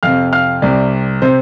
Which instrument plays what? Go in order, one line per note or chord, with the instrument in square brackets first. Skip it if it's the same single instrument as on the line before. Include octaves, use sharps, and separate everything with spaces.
[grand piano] F2 C3 F5 F6
F5 F6
C2 C3 D5
C3 C5